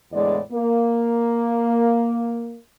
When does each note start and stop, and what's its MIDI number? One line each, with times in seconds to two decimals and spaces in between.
0.12 0.38 40
0.12 0.38 45
0.12 0.38 50
0.12 0.38 56
0.12 0.38 74
0.51 2.57 58